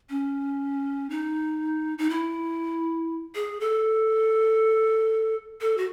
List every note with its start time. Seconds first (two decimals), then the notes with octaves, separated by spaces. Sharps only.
0.10 C#4
1.10 D#4
1.98 D#4
2.10 E4
3.35 G#4
3.61 A4
5.61 A4
5.78 F#4